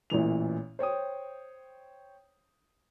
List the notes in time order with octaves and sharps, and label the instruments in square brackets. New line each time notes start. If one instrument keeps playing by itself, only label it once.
[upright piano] A1 A#2 E3 F7
C5 C#5 G5 D#6